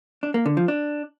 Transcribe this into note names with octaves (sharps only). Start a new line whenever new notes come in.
D4
A#3
D3
F3
D4